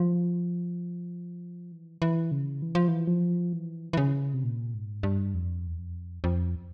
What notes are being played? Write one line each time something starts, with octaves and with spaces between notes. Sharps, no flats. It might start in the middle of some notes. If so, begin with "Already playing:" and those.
Already playing: F3
E3
E3
C#3
E3
F3
E3
F3
E3
E3
C#3
C3
A#2
G#2
G2
F2
E2
F2
F2